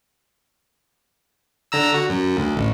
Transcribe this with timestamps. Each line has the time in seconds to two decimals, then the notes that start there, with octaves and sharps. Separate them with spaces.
1.72 D3 A#5 E6
1.94 F#4
2.09 F#2
2.37 D2
2.57 A1